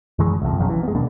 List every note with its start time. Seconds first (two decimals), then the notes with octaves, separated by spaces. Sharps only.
0.19 F#2 D#3 E3 G#3
0.42 C2 F2
0.58 F1 B1 F#2 C#3
0.69 E3
0.83 G#3 B3
0.95 D#2 B2 A#3 D4